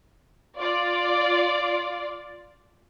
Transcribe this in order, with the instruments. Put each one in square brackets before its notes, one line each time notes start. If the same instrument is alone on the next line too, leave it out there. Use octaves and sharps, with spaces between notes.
[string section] F4 D5